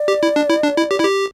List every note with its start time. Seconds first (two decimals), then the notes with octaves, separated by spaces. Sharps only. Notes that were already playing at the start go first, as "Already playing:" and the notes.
Already playing: D5
0.08 G4
0.23 E4
0.36 D4
0.50 E4
0.63 D4
0.77 E4
0.91 G4
1.00 E4
1.05 G4